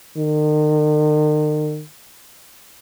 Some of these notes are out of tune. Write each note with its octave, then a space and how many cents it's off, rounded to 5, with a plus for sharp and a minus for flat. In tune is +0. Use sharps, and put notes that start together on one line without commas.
D#3 -40